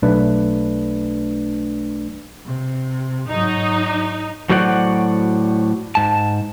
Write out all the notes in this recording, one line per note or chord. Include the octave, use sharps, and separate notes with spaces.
B1 A3 D4 B4
C3
G#2 F#3 D#4
A2 F#3 F#4 C5 D5 F#5
G#2 A5